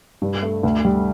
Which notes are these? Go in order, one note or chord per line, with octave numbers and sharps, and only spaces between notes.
G2
A3
D2
G3